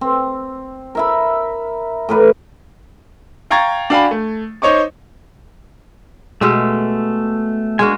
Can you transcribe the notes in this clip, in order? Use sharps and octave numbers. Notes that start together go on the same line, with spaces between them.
C4
A#4 E5 B5
A2 A#4 B4 D6
F5 G5 A#5 C#6 G#6 A6
D4 F#4 F5 G5 G#5 B5
A3
D#4 C5 C#5 D#5 C#6 D6
B2 G#3 A3 G4 E6
G#3 A#3 D4 F#4 G#5